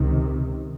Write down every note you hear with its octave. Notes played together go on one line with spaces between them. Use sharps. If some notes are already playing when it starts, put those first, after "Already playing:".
Already playing: C#2 C3 D#3